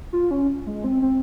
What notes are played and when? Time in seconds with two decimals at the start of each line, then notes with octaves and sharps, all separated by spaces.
0.13 F4
0.31 C#4
0.66 G#3
0.84 C4
1.02 C4